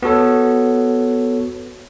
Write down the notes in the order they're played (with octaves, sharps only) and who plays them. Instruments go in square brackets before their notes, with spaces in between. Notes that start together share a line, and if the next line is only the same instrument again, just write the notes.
[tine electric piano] B3 F#4 A4 C#5